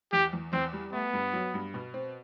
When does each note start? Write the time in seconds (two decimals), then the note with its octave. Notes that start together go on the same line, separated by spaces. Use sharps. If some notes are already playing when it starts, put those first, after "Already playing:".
0.12 E2 G4
0.33 E2
0.52 E2 C4
0.73 G3
0.93 A3 B3
1.13 G2
1.33 F#3
1.54 G2
1.74 B2
1.94 C4